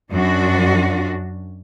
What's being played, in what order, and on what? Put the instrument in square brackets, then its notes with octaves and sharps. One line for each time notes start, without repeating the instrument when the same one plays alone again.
[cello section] F#2 D4 F#4